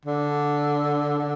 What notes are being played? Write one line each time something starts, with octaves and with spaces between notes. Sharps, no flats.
D3
D3